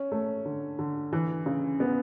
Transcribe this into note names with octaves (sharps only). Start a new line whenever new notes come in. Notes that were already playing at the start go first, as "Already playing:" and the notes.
Already playing: C#4
A3
D3
D3
E3
C#3
B3